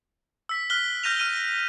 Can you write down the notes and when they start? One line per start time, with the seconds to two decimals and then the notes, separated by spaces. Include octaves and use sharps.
0.49 E6 B6
0.70 F6 F#6 B6 G7
1.03 F6 G6 A#6 D#7 F7
1.17 F6 D#7 F7 G7